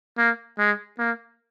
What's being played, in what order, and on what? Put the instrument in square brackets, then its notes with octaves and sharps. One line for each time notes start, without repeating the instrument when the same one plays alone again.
[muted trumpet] A#3
G#3
A#3